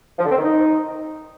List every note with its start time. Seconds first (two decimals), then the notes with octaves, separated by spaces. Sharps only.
0.19 F3
0.25 D3
0.31 C4
0.38 D#3
0.44 D#4